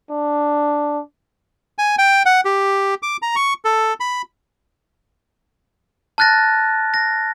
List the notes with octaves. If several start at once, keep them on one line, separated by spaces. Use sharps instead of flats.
D4
G#5
G5
F#5
G4
D6
A#5
C#6
A4
B5
A5 F6 F#6 A6 A#6
A#6